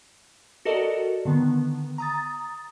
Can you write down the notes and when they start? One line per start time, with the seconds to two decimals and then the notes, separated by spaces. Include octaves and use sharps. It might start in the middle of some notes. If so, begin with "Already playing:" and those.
0.65 F#4 A4 A#4 D5 D#5
1.25 D3 D#3 B3
1.98 A#5 D#6 A6